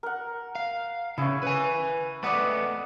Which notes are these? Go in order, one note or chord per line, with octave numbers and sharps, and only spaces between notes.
A#4 F#5
F5
C#3 C#4 E4 C#6
B4 G#5
A3 B4 D5 D#5 F#5 D6